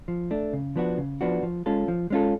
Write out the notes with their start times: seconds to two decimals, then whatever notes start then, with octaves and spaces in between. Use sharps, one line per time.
0.08 F3
0.31 A3 D4
0.53 C#3
0.76 F3 B3 D4 F#4
0.98 C#3
1.21 F3 B3 D4 F#4
1.43 F3
1.66 G#3 C#4 F4 A4
1.88 F3
2.10 G#3 C#4 F4 A4